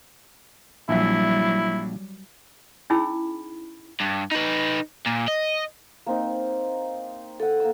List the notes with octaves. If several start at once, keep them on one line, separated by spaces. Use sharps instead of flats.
A#1 F#3 G3 E4 E5
C#4 D#4 E4 G#4 B5 E6
G2
D#4 B4
A#2
D#5
A#3 C4 D#4
A4 F#5 D#6
A#3 E6